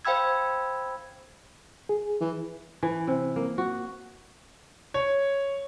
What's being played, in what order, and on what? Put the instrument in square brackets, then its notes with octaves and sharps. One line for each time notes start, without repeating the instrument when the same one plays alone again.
[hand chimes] C5 F5 G5 B5 E6 G#6
[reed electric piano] G#4
[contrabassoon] E3
[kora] E3
C3
A#3
F#4
[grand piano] C#5